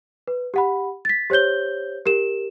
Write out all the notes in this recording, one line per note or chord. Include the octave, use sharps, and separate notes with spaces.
B4
G4 F#5 B5
A6 B6
G4 C5 C#5 G6 G7
G4 A#4 E7